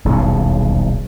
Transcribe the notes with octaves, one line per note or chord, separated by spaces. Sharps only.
D#1 B1 E2 C#3